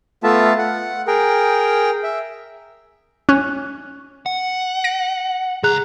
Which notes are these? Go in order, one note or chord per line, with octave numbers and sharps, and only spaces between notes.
A3 B3 F4 E5 A5
F#5
G#4 A#4 G5
E5
C#4 F#6
F#5
A#6 D7
C#2 G#4 A#5 F#6